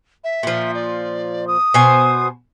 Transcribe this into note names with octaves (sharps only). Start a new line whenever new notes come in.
E5
A#2 F3
D5
D#6
B2 C5 G#5